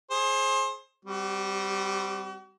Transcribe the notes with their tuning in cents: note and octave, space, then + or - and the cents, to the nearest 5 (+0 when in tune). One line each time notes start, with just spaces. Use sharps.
G#4 +15 C5 +30
G3 +0 C4 +0 F#4 +40